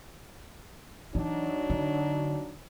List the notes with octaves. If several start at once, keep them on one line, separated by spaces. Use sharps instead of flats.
E3 F#3 D4 D#4
D3